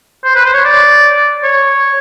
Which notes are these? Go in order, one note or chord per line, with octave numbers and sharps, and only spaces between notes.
C5
B4
C5
C#5
D5
C#5